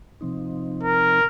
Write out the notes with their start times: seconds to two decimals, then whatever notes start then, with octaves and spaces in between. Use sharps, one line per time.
0.21 C3 F3 C4 D#4
0.83 A#4